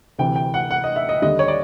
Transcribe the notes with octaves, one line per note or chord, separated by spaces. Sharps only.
D2 C3 E3 G5
G5
F#5
F#5
D#5
E5
D#5
D#2 D3 G3 D#5
C#5
D5